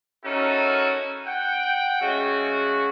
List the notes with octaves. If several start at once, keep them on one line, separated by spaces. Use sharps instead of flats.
C#4 D#4 E4 F#4 A4 A#4
F#5 G5
C#3 G#3 A3 F#4